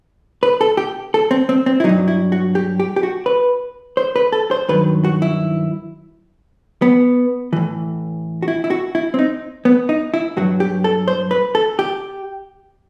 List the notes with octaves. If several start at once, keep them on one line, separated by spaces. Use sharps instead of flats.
B4
A4
G4
A4
C4
C4
C4
E4
F#3 D#4
G2
E4
F#4
G4
G4
G4
F#4
B4
C5
B4
A4
C5
G2 D#3 F#3 B4
F#4
E4
B3
A2 E3
F#4
E4
E4
F#4
E4
C4
D#4
B3
D#4
E4
G2 F#3 F#4
G4
A4
C5
B4
A4
G4